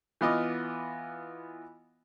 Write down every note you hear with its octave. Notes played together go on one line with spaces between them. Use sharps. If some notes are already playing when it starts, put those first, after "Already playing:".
E3 B3 F4 D#5 D6 F6